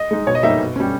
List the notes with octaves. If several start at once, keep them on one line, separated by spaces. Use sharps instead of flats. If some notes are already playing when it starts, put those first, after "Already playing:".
Already playing: D#5
G#3 D#4
B2 C#5
D#5
G3 A#3 D#4 E5
B2
G3 C#4